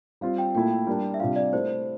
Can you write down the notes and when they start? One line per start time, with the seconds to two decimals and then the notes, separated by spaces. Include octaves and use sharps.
0.21 G3 C4 F4 F5
0.38 G5
0.54 A#2 A3 E4 G5
0.71 G5
0.87 G3 A#3 D4
1.14 E5
1.20 C3 G3 D4 F4 F5
1.36 D5
1.52 A3 E4 G4 A#4 C5